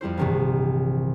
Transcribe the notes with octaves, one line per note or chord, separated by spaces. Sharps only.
F2 G3 E4 C5
A#1 G2 C3 D#3 E3